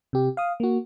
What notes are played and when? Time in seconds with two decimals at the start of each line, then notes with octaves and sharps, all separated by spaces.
0.13 C3 G4
0.37 F5 D#6
0.60 A#3 F#4